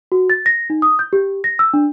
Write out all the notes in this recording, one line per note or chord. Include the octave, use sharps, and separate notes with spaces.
F#4
A6
A#6
D#4
D#6
G6
G4
A#6
E6
D4